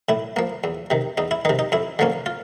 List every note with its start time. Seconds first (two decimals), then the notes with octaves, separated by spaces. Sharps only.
0.09 A2 E4
0.36 F3 A#3
0.64 E2
0.90 C3 D#3
1.18 E2 D#4
1.31 E4
1.45 C3 D#3 D#4
1.59 D#4
1.72 F2 E4
1.99 D3 F3 A#3 C#4
2.26 F4